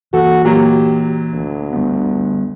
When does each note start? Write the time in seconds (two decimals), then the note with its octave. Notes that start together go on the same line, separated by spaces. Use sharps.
0.14 E3 A#3 F#4 A4
0.45 A#2 F#3 G4
1.34 D2
1.73 G3 B3